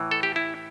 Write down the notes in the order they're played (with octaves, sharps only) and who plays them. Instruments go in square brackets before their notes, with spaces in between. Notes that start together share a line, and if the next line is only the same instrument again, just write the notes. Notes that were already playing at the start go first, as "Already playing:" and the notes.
Already playing: [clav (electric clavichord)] A2 E3
A4
G4
E4